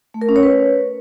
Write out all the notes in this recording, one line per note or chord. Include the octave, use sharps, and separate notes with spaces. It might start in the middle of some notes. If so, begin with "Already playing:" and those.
A3
A#4
C#4
C#5
B4